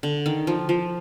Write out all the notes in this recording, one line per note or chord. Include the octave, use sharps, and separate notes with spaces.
D3
D#3
F3
F3